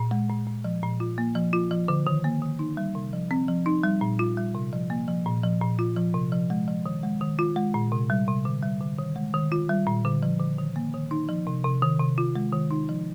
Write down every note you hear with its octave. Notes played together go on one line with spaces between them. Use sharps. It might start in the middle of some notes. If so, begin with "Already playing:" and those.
Already playing: A#2
G#3
A#2
A#2
F3
A#2
F4
A#3
F3
F4
F3
D3
D#3
A#3
D#3
D#4
G3
C3
F3
C4
F3
D#4
G3
A#2
F4
G3
C3
F3
A#3
F3
A#2
F3
A#2
F4
F3
C3
F3
G#3
F3
D#3
G#3
D#3
F4
G#3
A#2
C3
G3
C3
D3
G3
D3
D#3
G#3
D#3
F4
G3
A#2
D3
F3
D3
D#3
A#3
D#3
D#4
F3
C3
C3
D#3
C3
F4
G#3
D#3
D#4
F3